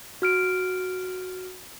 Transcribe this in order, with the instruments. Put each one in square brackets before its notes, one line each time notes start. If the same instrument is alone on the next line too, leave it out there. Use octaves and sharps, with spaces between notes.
[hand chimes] F#4 F6 D7